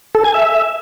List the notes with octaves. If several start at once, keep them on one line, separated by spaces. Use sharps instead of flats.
A4
G#5
E5